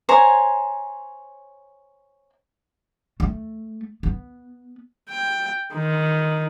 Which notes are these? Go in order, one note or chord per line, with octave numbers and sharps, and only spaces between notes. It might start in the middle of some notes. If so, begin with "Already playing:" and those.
C5 C#5 G#5 A#5
A3
B3
G5
D#3